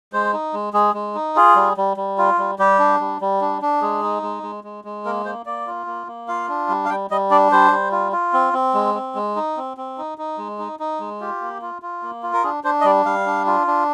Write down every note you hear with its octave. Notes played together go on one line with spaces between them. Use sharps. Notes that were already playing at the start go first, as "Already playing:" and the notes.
G#3 C5
D#4
G#3
G#3 G#4
G#3
D#4
F4 G#4
G3
G3
G3
F4
G3
G3 G4
D4
G3
G3
D4
D4
G#3 G#4
D#4
G#3
G#3
G#3
G#3
A#3 A#4
A#3 C5
A#3 D5
F4
A#3
A#3
F4 F5
D4
G3
F5
G3 G5
G3 D#5
D4 D5
G3 C5
G3
F4
F4
C4
C4
G#3
C4
G#3
D#4
C4
C4
D#4
D#4
G#3
D#4
D#4
G#3
F4 G4
A#3
F4
F4
A#3
F4
A#4
D4 G#4
D4 C5
D#5
G3 D5
G3 F5
D4
F4
D4